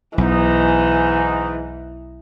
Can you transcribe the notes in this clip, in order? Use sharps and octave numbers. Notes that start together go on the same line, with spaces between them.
B1 G#2 E3 D#4